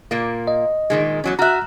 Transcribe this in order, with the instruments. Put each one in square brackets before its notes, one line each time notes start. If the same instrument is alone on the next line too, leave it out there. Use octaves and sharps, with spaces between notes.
[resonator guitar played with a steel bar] A#2 A#3
[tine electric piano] D#5
[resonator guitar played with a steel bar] A#2 D#3 G#3
E2 F#3 C#4
[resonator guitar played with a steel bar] F#4 E5 [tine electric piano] A#5 F6 F#6